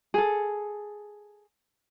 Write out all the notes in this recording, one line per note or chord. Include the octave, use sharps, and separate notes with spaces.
G#4 A4